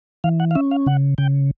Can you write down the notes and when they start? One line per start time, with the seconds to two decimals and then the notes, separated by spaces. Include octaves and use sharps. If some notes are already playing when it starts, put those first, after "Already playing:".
0.24 E3 F5
0.40 F#5
0.51 F5
0.55 C#4 E5
0.71 F5
0.86 C#3 F#5
1.18 C#3 G5